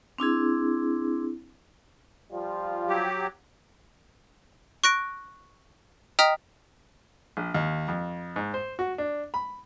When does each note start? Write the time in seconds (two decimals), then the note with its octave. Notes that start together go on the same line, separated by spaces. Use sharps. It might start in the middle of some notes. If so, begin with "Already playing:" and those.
0.18 C4 D4 E4 G#4
2.32 F3 G3 F4
2.88 F#3 G4
4.84 C#6 F#6 A#6 D7
6.19 D#5 G5 A#5 D#6 F6 B6
7.37 A#1
7.54 D#2
7.88 F2
8.36 G#2
8.54 C5
8.79 F#4
8.98 D4
9.34 B5